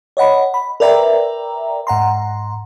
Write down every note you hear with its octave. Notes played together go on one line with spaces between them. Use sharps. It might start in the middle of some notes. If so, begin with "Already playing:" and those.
C#5 D#5 F#5 B5
B5
A#4 B4 D5 E5 G5 A#5
G#2 F#5 A#5 C6